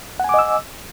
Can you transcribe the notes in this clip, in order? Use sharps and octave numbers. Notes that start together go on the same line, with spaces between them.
D#5 F#5 G#5 D6 E6